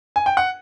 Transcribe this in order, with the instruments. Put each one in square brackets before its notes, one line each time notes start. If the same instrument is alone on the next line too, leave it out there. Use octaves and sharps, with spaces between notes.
[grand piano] G#5
G5
F#5